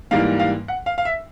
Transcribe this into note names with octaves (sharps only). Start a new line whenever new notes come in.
G#2 E3 G3 A#3 F5
F5
F#5
F5
F5
E5